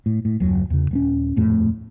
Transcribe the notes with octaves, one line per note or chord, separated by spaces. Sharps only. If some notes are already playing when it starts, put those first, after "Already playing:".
A2
A2
F#1 D#2 F#3
E2 C#3
D#1 G3 C#4
D#1 F2 A2 A3